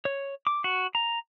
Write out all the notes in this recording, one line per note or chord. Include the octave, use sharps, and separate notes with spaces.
C#5
D6
F#4
A#5